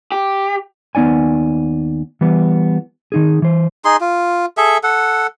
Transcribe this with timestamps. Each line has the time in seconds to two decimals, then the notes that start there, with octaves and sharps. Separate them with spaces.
0.12 G4
0.95 D#2 B3 D#4 D5 G#5
2.21 E3 G3 B3
3.12 D#3 D#4 G#4
3.42 E3 C5
3.85 D#4 G#4 C6
4.01 F4
4.57 G#4 A4 E5
4.83 A4 F#5